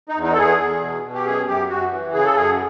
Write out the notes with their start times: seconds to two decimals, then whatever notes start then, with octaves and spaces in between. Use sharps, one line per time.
0.09 D#4
0.16 E2
0.23 D#4
0.33 A4
0.37 E2 G#4
0.59 E2
0.81 B2
1.03 B2
1.14 G4
1.25 F#2 G#4
1.47 F#2 G4
1.69 F#2 F#4
1.91 E3
2.13 C#3 G#4
2.24 A4
2.35 F#2 G#4